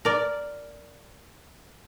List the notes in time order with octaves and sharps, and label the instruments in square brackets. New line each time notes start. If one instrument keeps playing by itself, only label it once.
[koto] A#4 D5